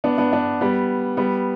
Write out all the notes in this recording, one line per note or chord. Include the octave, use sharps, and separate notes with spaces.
B3 D4
B3 D4
B3 D4
G3 B3
G3 B3